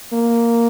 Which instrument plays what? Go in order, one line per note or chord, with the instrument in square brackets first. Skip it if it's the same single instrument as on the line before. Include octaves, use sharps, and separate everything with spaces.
[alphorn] A#3